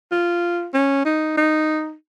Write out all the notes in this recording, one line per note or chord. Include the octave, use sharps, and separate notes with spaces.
F4
C#4
D#4
D#4